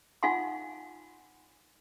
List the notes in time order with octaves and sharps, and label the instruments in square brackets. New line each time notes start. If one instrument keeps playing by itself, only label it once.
[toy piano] D#4 F4 F5 F#5 G#5 C6